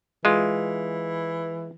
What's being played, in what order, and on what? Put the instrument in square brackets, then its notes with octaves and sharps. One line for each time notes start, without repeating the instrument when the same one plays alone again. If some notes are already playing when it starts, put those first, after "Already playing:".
[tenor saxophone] E3 [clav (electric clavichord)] G#3 F4